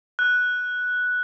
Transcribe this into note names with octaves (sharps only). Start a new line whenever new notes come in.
F#6